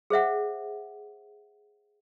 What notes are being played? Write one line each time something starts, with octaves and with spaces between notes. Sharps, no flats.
G#4 C5 E5 F#5